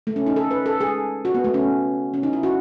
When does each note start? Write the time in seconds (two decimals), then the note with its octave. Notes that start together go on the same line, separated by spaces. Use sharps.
0.07 A3
0.16 C#4
0.27 D#4
0.36 A4
0.51 B4
0.66 A4
0.81 G#4
1.25 F#4
1.35 B3
1.44 A3
1.54 C#4
2.14 C#4
2.23 D#4
2.33 E4
2.43 F#4